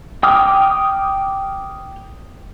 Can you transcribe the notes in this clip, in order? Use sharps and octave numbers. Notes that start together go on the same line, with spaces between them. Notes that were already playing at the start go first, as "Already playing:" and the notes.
G5 D6 D#6 F6